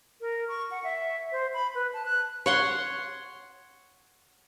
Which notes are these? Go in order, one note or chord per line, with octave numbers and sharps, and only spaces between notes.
A#4
C#6
F#5
E5
C5
B5
B4
A5
F#6
C#5 F#5 C6